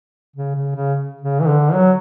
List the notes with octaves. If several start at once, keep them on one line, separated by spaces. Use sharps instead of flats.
C#3
C#3
C#3
C#3
E3
D3
F#3